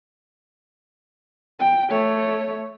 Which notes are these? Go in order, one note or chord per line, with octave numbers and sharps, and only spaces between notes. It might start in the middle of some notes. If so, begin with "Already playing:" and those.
G5
A3 C#5